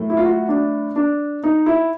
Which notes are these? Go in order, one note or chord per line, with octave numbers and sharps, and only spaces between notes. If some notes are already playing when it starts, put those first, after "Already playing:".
Already playing: A2 F#3 A3
E4
F4
F#4
D4
D4
D#4
E4